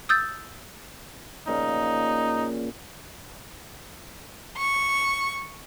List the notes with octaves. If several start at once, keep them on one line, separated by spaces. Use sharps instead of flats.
D#6 E6 G6 A6
A#2 C#3 F3 D#4
C#6